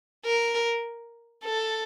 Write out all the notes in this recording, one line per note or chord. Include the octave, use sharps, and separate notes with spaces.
A#4
A4